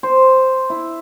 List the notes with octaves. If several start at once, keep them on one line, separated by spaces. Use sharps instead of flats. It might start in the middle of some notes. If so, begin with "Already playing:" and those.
C5
E4